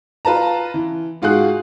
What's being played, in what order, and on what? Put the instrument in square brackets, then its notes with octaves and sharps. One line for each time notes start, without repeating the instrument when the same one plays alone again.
[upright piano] F4 B4 A5 A#5
E3
G#2 F4 F#4 G#4 F#6